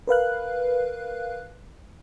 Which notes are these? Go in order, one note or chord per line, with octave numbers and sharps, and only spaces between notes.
A#4 B4 F5 F#6